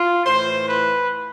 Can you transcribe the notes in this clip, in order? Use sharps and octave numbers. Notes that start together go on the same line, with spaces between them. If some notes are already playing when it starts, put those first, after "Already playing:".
Already playing: F4
A2 E3 C5
B4